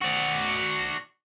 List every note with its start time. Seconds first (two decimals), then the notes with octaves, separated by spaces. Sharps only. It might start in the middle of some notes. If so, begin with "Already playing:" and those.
0.01 F#4 D5